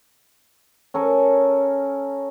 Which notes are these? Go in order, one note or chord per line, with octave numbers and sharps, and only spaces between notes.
C#4 A4 A#4